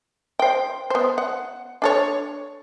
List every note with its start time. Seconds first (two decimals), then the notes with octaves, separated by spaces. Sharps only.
0.39 C5 G5
0.90 B3 C5
1.18 F#5
1.82 D4 A4 C#5